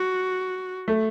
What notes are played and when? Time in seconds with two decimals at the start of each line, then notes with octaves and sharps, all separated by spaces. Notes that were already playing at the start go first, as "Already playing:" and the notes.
Already playing: F#4
0.88 A3